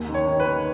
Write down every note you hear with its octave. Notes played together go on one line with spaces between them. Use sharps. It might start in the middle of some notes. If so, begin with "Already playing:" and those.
Already playing: D#2
D#3
C#5
D#3
B4
D#3